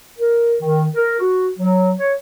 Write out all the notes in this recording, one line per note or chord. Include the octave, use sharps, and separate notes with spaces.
A#4
D#3
A#4
F#4
F#3
C#5